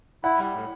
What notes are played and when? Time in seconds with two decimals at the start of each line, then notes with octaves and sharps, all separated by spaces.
0.24 E4 F#5
0.39 G3
0.54 A2